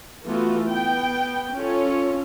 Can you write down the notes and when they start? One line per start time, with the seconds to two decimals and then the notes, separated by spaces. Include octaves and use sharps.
0.25 E3 A3 B3 F4 F#4
0.67 B3 G5
1.55 C#4 F4 A4 C#5